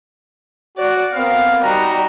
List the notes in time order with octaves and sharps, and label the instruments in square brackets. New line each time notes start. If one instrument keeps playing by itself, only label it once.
[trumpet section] F#4 [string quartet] D5
[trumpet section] B3 F5 [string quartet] C4 A#4
[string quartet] G3 [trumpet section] D#4 F#4 A#5